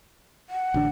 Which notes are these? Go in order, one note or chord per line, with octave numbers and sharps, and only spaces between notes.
F#5
A1 D3 D4